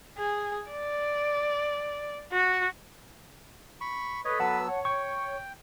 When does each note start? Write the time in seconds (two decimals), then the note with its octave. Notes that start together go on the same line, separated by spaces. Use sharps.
0.17 G#4
0.70 D5
2.32 F#4
3.81 B5 C#6
4.25 A4 B4 C#5 D#5
4.40 F#3 B3 F#5 A5 E6
4.69 C#5
4.85 G5 C#6